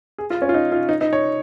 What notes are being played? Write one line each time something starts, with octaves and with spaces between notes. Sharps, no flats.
G#4
F4
C#4
F4
D#4
F4
D#4
D#4
C#5